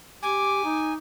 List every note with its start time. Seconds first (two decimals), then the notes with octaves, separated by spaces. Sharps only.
0.23 G4 G#5 D6
0.64 D#4